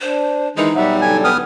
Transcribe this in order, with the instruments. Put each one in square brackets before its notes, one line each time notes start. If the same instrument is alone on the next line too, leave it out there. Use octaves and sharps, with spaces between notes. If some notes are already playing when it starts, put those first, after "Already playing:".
[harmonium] D4 [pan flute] C5
[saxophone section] D#3 E3 G#3 [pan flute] D#4
[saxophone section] B2 F#3 G3 [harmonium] E5 F#5
[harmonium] D3 A4 G5 [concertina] G#5
[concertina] B3 D#6 F6 [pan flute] B4